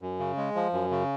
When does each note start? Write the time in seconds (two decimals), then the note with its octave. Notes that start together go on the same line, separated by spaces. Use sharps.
0.02 F#2
0.19 C#3
0.37 G#3
0.55 F3
0.73 F#2
0.91 C#3